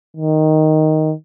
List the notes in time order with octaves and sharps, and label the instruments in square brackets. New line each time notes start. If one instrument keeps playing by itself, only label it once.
[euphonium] D#3